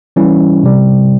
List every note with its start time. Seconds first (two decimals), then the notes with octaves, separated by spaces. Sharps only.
0.16 E3 G3 C#4 E4
0.64 C3 G3